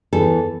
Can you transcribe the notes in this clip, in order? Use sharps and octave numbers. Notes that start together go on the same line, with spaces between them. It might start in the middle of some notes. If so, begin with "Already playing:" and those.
E2 E3 A4